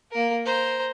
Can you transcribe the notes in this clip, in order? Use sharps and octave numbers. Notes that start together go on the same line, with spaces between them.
A#3 A#4
C5 A#5